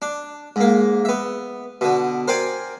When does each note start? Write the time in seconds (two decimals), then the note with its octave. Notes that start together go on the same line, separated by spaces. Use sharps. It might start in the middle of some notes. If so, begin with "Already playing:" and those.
0.02 D4
0.56 G#2 A#3
1.05 B3 E5
1.81 B2 D3
2.28 A#4 C5 D5 G5 G#5